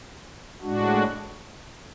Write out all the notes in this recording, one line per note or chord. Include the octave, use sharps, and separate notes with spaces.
A2 G#3 D4 F#4